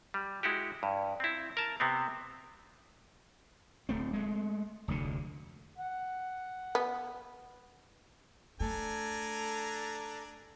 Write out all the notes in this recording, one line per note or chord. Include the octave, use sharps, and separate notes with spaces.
G3
G#3 E4 F#4 G4
G2
C4 E4
A#4 A5
C3 B3 C4
D1 A3 C4
G#3 A3
F1 D2 D3
F#5
B3
A3 D4 A4 G#5 A#5